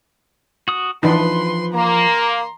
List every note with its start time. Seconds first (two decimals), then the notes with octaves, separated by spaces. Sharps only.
0.68 F#4 D#6
1.03 E3 F3 D4 D#4 B4 C6
1.74 A#3 A#5 C6